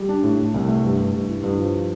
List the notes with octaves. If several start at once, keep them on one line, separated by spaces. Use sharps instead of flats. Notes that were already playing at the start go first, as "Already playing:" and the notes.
Already playing: G3
D4
A2
A3
C2
A3
G2
G2
G2
E4
G2
F3